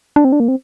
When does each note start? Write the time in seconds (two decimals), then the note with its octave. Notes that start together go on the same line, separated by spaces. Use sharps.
0.16 D4
0.25 C4
0.32 D4
0.40 A#3
0.48 C4